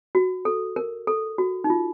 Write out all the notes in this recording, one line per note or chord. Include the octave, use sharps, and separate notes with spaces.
F#4
A4
A#4
A4
F#4
D#4
F4